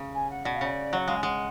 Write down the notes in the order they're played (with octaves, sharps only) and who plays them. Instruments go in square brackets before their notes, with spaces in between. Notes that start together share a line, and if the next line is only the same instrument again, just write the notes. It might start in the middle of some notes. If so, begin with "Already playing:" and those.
Already playing: [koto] C#3
[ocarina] G#5
F#5
[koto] B2 [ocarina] D5
[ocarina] F5
[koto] C#3 [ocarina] D5
[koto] F#3 [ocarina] F#5
[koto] G#3 [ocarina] F5
[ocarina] G#5
[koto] G#3 [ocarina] F#5